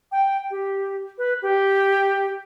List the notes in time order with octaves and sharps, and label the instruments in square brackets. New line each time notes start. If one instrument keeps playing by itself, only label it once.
[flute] G5
G4
B4
G4